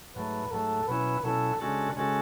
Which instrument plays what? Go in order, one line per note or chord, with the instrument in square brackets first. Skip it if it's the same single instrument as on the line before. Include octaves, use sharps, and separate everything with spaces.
[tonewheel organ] G#2 F#3 A3 [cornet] B4
[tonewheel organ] G#2 F#3 A3 [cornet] A4
[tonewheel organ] B2 F#3 C#4 E4 [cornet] B4
[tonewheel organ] B2 F#3 C#4 E4 [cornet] A4
[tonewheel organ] C#3 G#3 C#4 F#4 A4 [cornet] D4
[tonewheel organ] C#3 G#3 C#4 F#4 A4